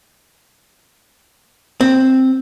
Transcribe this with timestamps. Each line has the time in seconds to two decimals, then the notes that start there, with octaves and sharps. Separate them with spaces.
1.81 C4